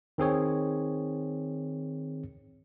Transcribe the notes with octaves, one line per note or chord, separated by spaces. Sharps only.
D#3 C4 G#4 C#5